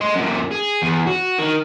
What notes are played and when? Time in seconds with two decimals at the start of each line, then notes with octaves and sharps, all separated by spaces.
0.01 D#5 C6
0.16 F#2 A#2
0.51 G#4
0.82 E2
1.07 F#4
1.38 D#3